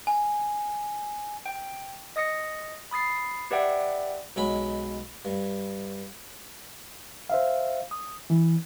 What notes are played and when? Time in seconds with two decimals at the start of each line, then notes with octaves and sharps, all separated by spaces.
0.07 G#5
1.46 G5
2.16 D#5 D#6 A#6 C#7
2.91 B5 D#6 A6 C7
3.51 G4 B4 D5 E5 F#5 G5
4.36 B1 F#3 G#3 B5
5.25 G2
7.30 C5 E5 F5
7.91 D#6
8.30 E3